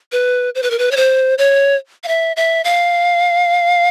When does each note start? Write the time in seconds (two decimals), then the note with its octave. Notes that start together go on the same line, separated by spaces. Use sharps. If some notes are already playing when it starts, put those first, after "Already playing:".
0.12 B4
0.55 C5
0.63 B4
0.71 A#4
0.79 B4
0.91 C#5
0.97 C5
1.38 C#5
2.04 F5
2.08 E5
2.36 E5
2.64 F5